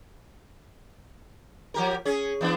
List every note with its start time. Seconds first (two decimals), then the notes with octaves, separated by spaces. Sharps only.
1.74 F3 G4 A#4
2.05 C#4 G#4
2.41 E3 B3 D4